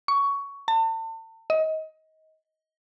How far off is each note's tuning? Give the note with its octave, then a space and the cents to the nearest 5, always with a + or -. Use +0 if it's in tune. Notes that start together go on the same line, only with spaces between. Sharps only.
C#6 +15
A5 +40
D#5 +25